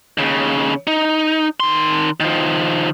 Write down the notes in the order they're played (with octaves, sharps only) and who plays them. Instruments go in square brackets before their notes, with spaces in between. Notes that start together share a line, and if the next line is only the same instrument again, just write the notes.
[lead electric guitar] D#2 C#3
D#4
D#3 C6
D#3 F3